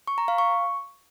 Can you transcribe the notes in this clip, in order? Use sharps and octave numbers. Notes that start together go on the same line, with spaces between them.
C#6
A#5
F5
C#6